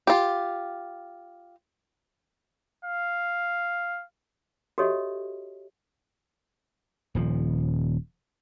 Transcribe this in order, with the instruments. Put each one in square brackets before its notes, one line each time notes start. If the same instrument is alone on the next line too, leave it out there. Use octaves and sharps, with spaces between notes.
[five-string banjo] F4 G4
[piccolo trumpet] F5
[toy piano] F#4 G4 A4 C#5 D#5 E5
[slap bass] D#1 F3